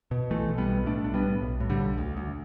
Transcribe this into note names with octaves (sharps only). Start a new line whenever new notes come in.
B2
B1 E3 A3
B1
G3 B3
B2
A2 A3 D4
B1 D4
G3 B3
A2
B1
A2
D3 G3
B1
D2
D2